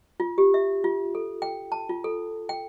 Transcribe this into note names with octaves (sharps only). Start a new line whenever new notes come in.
F4
G4
E5
F4
A4
G5
A5
F4
A4
G5